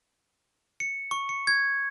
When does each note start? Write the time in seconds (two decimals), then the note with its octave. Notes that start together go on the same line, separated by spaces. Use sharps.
0.80 C#7
1.11 C#6
1.29 C#7
1.47 G#6